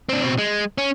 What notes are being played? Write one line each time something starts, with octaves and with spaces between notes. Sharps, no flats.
C4 D4
B2 C4
G#3
C#4